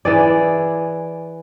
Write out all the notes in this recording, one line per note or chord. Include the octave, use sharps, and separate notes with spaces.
E3 G#4 D5